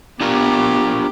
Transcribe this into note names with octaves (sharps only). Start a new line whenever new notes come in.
B3 D4 F4 G4 A#4